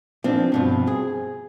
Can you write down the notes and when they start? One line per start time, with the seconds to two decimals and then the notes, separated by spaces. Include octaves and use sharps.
0.24 F3 C4 D4
0.52 G2 B2 F3
0.87 G#4